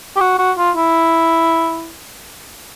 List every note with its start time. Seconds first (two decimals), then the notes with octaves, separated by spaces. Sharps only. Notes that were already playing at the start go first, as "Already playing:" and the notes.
0.16 G4
0.21 F#4
0.39 F#4
0.58 F4
0.76 E4